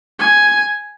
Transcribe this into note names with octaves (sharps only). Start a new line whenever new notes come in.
G#5